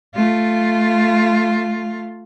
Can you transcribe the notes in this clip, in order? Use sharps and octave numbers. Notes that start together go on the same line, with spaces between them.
A3 F4